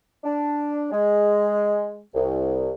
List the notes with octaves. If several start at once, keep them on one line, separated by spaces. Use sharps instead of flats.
D4
G#3
C2